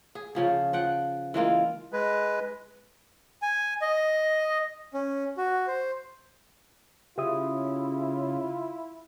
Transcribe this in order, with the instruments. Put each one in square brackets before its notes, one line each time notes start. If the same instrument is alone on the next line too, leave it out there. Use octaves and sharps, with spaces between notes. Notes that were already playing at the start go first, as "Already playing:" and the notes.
[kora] G#4
C#3 F3 G#4
F3 F#5 G5
E3 G#3 A#3 F4
[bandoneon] G#3 B4
[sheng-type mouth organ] G#5
D#5
C#4
F#4
C5
[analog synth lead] C#3 [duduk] E4 [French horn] F4 [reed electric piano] G4 E5 D#6